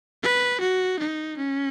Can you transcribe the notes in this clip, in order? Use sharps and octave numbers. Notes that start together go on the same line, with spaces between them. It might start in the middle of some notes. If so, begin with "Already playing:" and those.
B4
F#4
D#4
C#4